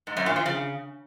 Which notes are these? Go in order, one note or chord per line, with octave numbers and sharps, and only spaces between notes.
G#2
F#2
A#2
F3
C#3